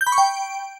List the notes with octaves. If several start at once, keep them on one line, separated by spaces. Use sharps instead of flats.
G6
B5
C#6
G5